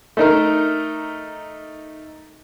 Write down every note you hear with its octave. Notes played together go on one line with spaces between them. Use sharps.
A3 D#4 A#4